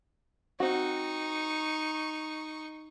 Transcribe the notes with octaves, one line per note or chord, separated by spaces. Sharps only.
C4 D#4 F#4 C#6